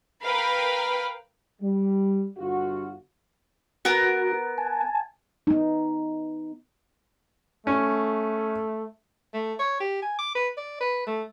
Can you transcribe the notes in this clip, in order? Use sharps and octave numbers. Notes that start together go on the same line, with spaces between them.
A#4 B4 F5 G5 B5
G3
G1 F4 F#4
B3 F#4 A#4
G#5 A5
B3 D#4
A3 C#4
A3
C#5
G4
G#5
D6
B4
D5
B4
A3